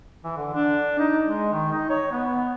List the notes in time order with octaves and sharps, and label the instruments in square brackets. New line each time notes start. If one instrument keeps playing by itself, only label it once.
[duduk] E3
D3
D4
D#4
G#3
D#3
D#4
C#5
B3